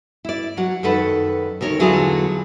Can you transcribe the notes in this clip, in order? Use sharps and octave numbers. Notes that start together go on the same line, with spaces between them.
E4 D5
F#3 F#5
F#2 D#3 A4 B4 F#5
D2 D#3 A#4 C#5
E2 D3 F#3 E4 F4 G#4